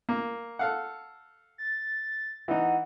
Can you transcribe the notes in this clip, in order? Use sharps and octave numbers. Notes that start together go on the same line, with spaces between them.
A#3
A4 F5 F#5
A6
E3 D#4 F#5